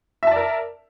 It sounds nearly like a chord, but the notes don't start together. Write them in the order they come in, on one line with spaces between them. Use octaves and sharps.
E5 A5 D5 A#4